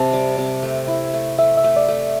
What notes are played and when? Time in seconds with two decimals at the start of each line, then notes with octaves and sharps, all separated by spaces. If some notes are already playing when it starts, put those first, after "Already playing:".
Already playing: C3 C4 A5
0.13 G3
0.38 C3
0.63 A3
0.88 E4
1.14 A3
1.38 A3 E5
1.57 E5
1.64 A3
1.76 D5
1.88 A3